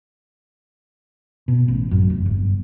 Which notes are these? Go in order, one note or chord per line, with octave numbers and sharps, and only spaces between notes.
B2
A1
F#2
F1
G1